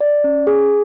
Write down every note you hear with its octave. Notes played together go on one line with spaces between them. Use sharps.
D5
C#4
G#4